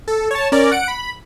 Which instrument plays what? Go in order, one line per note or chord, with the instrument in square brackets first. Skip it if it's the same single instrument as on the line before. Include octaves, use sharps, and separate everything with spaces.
[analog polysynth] A4
C#5 A5
C#4 A#4 D5
F#5 D7
B5